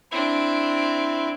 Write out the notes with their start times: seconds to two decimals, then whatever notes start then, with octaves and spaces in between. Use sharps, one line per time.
0.12 C4 D4 E4